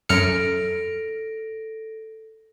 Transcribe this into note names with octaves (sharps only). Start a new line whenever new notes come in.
F#2 A4 F6 A#6 C#7 D7